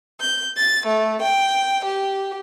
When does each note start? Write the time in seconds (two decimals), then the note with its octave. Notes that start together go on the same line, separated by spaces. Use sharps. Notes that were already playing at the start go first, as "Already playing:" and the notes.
0.20 G6
0.56 A6
0.87 A3
1.21 G5
1.85 G4